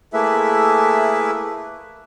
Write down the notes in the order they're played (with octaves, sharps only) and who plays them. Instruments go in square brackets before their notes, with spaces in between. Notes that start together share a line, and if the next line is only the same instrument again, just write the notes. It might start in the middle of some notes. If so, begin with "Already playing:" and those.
[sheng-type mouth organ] A3 A#3 E4 G#4 B4 E5